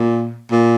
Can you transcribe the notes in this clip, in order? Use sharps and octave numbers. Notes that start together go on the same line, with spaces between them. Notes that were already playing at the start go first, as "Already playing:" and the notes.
Already playing: A#2
A#2